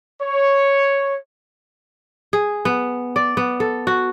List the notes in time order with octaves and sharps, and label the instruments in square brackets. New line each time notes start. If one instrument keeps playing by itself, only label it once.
[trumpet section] C#5
[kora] G#4
B3
D5
B3
A4
F#4